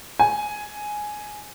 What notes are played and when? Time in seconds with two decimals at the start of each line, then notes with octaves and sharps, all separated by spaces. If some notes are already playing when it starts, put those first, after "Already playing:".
0.19 G#5